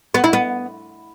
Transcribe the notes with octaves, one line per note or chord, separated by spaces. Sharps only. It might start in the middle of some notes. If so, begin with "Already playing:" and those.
B3
E4
B3